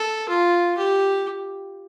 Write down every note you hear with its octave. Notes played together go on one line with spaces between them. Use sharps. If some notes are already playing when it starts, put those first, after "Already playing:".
Already playing: A4
F4
G4